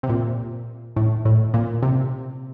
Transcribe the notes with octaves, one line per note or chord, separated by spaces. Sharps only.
C3
A#2
A2
A2
A#2
C3